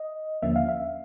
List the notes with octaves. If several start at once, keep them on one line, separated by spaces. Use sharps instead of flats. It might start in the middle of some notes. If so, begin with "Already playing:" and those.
Already playing: D#5
D#2 D3 F3 A#3 C#4 E5
F5
E5